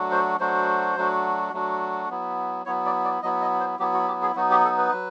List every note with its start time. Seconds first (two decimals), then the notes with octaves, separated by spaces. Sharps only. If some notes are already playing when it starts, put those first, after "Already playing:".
Already playing: F#3 A3 D4 F#4
0.11 C5
0.40 F#3 A3 D4 F#4 C5
0.96 F#3 A3 D4 F#4
1.53 F#3 A3 D4 F#4
2.10 F#3 B3 E4
2.66 F#3 B3 E4 C#5
2.85 D5
3.04 D5
3.22 F#3 B3 E4 D#5
3.41 D#5
3.60 C5
3.79 F#3 B3 E4 G4
3.93 F#4
4.08 G4
4.22 G#4
4.35 F#3 B3 D#4 F#4
4.51 G4
4.64 A4
4.78 B4
4.92 F#3